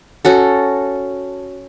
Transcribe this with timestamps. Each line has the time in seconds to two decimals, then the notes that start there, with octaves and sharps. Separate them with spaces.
0.25 C#4 F#4 A4